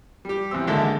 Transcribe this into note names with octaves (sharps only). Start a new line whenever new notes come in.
G3 G4
E2 C3 C4 E6
G#1 D3 G#3 A#3 A4 E5